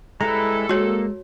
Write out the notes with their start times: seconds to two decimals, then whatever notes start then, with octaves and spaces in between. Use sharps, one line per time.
0.21 G3 G#3 E4 A4 B4 A#5
0.69 G#3 A#3 F#4 C#5